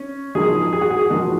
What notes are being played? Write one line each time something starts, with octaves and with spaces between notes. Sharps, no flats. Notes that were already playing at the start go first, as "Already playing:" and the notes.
Already playing: C#4
A#1 G#2 F3 G#4
G#4
F#4
G#4
A#1 G#2 F3 F#4